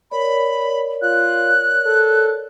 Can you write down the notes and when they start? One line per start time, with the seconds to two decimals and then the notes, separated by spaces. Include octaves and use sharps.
0.11 A#4 C#5 D5 B5
1.02 F4 F#6
1.86 A4